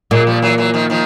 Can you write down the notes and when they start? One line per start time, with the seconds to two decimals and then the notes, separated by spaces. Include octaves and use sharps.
0.11 A#2 F#3 G#3
0.27 F3 G3
0.42 E3 F#3
0.58 E3 F#3
0.74 D#3 F3
0.90 D#3 F3